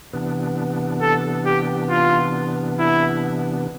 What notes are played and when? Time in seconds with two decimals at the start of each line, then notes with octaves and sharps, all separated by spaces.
0.13 C3 E3 B3 D4
1.02 A4
1.46 G4
1.90 F4
2.79 E4